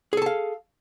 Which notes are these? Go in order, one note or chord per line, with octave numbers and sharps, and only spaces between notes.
G#4 A4 F5 A5